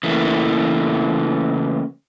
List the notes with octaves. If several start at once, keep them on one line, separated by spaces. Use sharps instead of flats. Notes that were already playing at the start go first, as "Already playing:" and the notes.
C#3 E3 A3 A#3